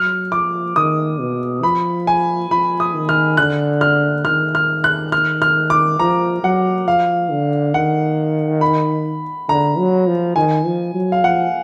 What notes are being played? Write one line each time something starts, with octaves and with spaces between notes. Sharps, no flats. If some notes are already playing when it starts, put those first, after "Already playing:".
Already playing: F#3 F6
F3 D6
D#3 D#6
B2
F3 B5
G#5
F3 B5
D#6
D#3
F6
D3 F#6
F6
D#3 F6
F6
F#6
F6
F6
D6
F3 A#5
F#3 F#5
F3 F5
D3
D#3 F#5
B5
D3 A#5
F#3
F3
D#3 G#5
F3
F#3
F5
F3 F#5